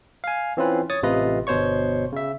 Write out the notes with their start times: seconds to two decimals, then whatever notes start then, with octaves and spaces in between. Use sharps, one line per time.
0.24 F5 G#5
0.57 E3 C4 C#4 F4 B4
0.90 C#5 C#6 D#6 A6
1.03 A1 C3 F4 B4 D#5
1.47 G1 B2 C5 C#5 C#6
2.12 C#3 E5